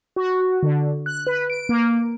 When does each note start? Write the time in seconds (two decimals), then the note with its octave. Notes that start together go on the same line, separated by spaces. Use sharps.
0.16 F#4
0.63 D3
1.06 F#6
1.27 B4
1.50 D7
1.69 A#3